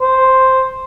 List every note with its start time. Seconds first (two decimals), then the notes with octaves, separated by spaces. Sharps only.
0.01 C5